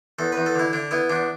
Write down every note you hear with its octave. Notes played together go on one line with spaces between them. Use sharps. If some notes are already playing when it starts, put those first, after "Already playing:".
E2 A4
B4
E2
A4
D3 E4
D3 D4
B3 E4
E2 D4